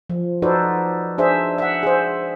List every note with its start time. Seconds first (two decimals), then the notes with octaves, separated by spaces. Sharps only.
0.10 F3
0.42 D#4 F#4 A4 B4 C5 D5
1.18 D4 G#4 C5 E5
1.58 E5 F#5
1.83 G#4 C5